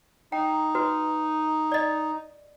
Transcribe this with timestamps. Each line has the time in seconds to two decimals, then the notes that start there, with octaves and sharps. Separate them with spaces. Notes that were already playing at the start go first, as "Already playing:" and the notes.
0.32 D#4 G5 A#5
0.75 F#4 B4
1.72 D5 D#5